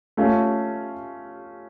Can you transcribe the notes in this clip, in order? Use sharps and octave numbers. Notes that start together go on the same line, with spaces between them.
A3 C#4 F4